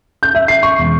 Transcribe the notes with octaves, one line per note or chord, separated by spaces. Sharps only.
G6
E5
C7
C#6
E1